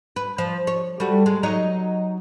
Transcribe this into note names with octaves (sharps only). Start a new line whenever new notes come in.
B4
F3
C#5
G3 A3 F#4
G#3
F#3 D#4 C#5